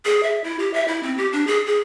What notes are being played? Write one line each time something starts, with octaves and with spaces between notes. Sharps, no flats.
G#4
E5
E4
G4
E5
E4
C4
G4
D4
G#4
G#4